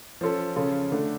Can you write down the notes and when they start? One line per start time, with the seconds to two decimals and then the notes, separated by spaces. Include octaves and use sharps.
0.21 F3 C#4 F4 A4
0.56 C#3 F3 C#4 F4 A4
0.92 D3 A3 D4